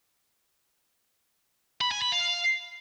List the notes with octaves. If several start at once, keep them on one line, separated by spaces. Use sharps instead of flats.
B5
G#5
B5
F5